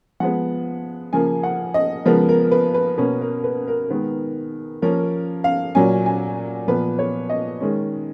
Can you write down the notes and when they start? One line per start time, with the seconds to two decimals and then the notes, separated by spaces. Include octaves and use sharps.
0.20 F3 G#3 B3 F#5
1.13 C#3 F3 A#3 G#5
1.43 F#5
1.74 D#5
2.05 C#3 F3 G#3 B3 A#4
2.29 A#4
2.51 B4
2.74 B4
2.98 B2 A#3 C#4 B4
3.21 A#4
3.44 B4
3.67 A#4
3.90 D#3 G#3 B3
4.82 F3 A#3 C#4 A#4
5.44 F5
5.75 A#2 F#3 C#4 G#5
6.06 G#5
6.68 A#2 F3 B3 B4
6.99 C#5
7.30 D#5
7.60 D#3 G#3 C#4